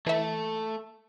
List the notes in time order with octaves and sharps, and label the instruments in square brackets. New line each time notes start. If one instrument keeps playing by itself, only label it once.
[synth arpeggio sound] E3 E5 [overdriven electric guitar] A3